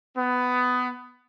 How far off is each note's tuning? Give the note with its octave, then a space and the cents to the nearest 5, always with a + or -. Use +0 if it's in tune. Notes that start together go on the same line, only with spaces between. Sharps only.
B3 +15